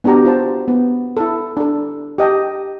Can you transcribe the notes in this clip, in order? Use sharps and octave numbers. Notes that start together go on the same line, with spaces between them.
B3 D4 F#4 G4 A#5
F4 C5 A5
B3
E4 A4
D4 A4
G4 D#5 G5 A5